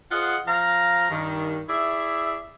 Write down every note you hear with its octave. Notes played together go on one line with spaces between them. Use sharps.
F4 G#4 C5 D#5 F#5
F3 F5 A#5
G2 D#3
E4 G#4 D5 E5